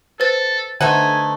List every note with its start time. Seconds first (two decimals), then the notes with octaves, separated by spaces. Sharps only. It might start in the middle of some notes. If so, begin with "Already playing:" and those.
0.20 A4 B4 C5 A6
0.81 D3 A3 D#4 B4 C5 F#5 G#5 D#7